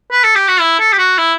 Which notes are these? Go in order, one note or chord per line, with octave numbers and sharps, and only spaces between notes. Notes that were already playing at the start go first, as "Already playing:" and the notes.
B4
A4
G4
F#4
E4
A4
G4
F#4
E4